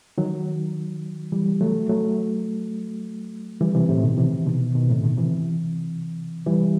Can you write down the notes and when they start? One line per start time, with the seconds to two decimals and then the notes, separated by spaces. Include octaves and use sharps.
0.18 D#3 F#3
1.32 E3 G3
1.61 F#3 A3
1.89 F#3 A3
3.61 E3 G3
3.75 C3 E3
3.89 A2 C3
4.03 B2 D#3
4.18 C3 E3
4.47 B2 D#3
4.75 B2 D#3
4.89 A2 C3
5.03 B2 D#3
5.18 C3 E3
6.46 E3 G3